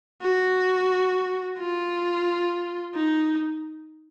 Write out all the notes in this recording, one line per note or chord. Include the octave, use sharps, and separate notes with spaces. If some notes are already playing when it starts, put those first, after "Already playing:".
F#4
F4
D#4